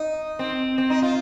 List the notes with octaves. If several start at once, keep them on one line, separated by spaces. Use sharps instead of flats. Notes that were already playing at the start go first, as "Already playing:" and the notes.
Already playing: D#4
C4
C4
D#4
F4